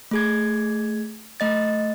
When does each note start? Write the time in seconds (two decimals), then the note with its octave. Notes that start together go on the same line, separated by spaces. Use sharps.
0.11 A3 G#4 G#6
1.40 A3 D#5 A6